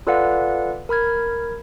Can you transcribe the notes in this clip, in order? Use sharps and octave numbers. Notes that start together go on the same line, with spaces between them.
F4 A4 B4 D5 F5 F#5
A#4 B5 F6 G#6